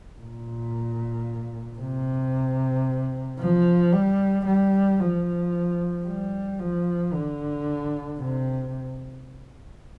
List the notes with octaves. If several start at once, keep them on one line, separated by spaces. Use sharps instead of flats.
A#2
C3
F3
G3
G3
F3
G3
F3
D3
C3